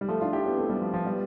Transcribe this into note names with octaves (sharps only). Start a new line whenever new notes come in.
G3
F3 A3
D4 F4
E4 G4
B3 D4
A3 C4
G3 B3
F3
F3
G3 B3